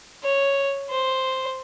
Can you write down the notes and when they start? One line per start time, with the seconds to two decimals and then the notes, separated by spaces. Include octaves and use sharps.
0.23 C#5
0.90 C5